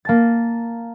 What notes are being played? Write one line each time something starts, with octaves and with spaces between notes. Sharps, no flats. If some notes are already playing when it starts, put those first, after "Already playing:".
A#3 A5 A6